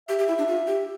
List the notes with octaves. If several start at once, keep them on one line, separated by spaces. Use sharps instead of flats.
G4 E5
G4
E4
D4
F4
G4